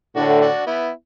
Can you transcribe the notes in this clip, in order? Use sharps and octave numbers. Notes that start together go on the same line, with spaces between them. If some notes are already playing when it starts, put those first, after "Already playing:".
A2 D3 D4 F#4
D4 F#4
B3 E4